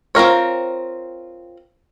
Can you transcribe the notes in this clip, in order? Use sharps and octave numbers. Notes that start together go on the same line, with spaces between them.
C4 F4 A#4 C#5